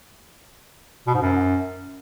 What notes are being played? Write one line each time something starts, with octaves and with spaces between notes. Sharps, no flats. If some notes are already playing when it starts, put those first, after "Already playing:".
B2
G#2
F#2